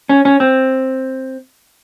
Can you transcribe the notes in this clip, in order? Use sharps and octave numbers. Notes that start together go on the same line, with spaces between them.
C#4
C#4
C4